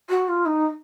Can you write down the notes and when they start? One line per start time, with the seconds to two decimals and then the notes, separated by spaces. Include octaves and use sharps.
0.09 F#4
0.28 F4
0.45 D#4